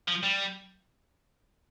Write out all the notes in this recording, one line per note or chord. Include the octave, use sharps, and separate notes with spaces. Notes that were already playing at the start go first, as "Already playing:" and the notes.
F3
G3